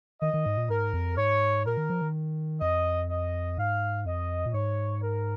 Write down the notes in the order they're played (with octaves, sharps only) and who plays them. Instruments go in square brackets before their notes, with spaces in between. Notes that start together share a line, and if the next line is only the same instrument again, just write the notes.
[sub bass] D#3 [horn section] D#5
[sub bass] D#3
G#2
A#2
[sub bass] G#2 [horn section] A#4
[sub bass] F2
[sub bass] G#2 [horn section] C#5
[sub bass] A#2 [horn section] A#4
[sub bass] D#3
F3
D#3
[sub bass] F2 [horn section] D#5
[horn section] D#5
[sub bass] G#2 [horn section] F5
[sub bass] F2 [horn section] D#5
[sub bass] A#2
[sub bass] G#2 [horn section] C#5
[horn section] A#4